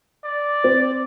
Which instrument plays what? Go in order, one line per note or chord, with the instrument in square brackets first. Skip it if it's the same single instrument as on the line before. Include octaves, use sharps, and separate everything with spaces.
[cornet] D5
[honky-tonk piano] C4